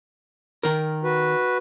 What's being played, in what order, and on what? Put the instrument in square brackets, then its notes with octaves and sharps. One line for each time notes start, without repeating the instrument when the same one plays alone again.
[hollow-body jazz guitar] D#3 A#4
[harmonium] F#4 B4